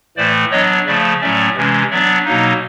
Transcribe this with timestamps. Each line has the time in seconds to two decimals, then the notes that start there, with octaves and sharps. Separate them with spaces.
0.17 A2 E3 A3 C5 D5
0.51 F#3 B3 D4 C#5 D#5
0.86 C#3 F3 A3 D5 E5
1.21 A2 F#3 A3 C#4 D5 E5
1.56 C3 E3 G#3 C#4
1.90 F#3 B3 D4 D5 E5
2.25 B2 F#3 A#3 D#4